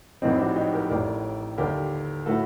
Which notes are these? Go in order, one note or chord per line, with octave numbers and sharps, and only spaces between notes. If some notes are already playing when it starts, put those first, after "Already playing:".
A#1 A2 G3 C4 D#4
D4 F#4
D#4 G4
G4 A#4
A1 A2 G3 A#4 D5
D#2 D3 G3 G4 A#4
A2 A3 F#4 A4